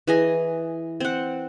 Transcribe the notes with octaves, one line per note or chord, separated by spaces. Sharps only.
E3 G#4 D#5
C4 F#5